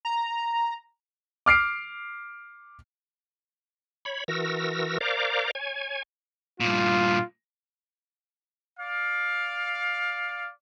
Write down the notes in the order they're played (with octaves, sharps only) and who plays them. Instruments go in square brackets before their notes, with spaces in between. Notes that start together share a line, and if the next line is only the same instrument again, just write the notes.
[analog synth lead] A#5
[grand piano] D6 F6 C7 D7
[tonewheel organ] C#5 B5
E3 F#4 A#4 E6 A#6
A#4 C5 D5 F5 A#5 D6
C#5 G#5
[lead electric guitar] G2 A#2 [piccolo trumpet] F4
[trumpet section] D5 F5